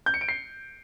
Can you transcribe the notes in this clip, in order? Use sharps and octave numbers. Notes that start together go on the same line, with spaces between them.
G6
C#7
D7
C7